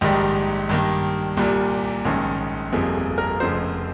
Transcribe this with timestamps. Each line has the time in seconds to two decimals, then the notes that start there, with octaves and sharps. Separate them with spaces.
0.01 A#1 G#2 D#3 G3 G4
0.69 G2 D#3 A#3
1.37 C2 A#2 G3
2.05 A#1 G#2 D#3 A#3 C#4
2.72 G1 F2 C3 F3 A#3 G#4
2.95 G#4
3.18 A#4
3.40 F1 F2 C#3 F3 C5